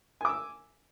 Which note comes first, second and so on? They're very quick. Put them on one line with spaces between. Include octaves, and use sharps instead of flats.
G#5 D6 E6